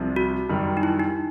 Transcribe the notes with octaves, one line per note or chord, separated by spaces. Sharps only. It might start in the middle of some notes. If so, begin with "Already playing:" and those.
Already playing: C2 C3 F3
F#4
F#2 D#3 G3
D#4
E4
D#4